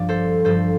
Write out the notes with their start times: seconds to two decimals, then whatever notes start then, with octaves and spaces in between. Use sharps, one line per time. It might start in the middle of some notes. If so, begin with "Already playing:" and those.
Already playing: G2 F3 D5
0.09 A4 C5
0.45 G2 F3 A4 C5